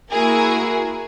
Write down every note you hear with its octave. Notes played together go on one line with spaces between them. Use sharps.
A#3 E4 F#4 G#4 A#4